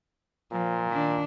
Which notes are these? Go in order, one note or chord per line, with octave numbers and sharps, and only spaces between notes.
A#2 F3
D#3 D4